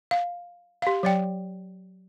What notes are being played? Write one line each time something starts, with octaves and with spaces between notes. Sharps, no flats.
F5
G4 F5
F#3 D5 G5